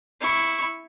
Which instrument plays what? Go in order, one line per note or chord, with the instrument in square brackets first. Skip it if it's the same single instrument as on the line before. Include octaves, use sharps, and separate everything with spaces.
[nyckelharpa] E4 C#6